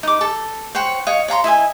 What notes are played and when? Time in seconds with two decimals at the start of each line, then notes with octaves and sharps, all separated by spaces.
0.03 D#4 D6
0.21 A4
0.75 C5 C#5 F#5 G5
1.07 C#5 D#5 F5
1.28 C#5 F5 A#5 C6
1.44 E4 D#5 E5 G#5